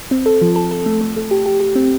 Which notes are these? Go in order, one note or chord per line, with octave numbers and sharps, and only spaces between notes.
C4
A4
F3
A4
A4
A3
A3
A3
G4
G4
G4
C4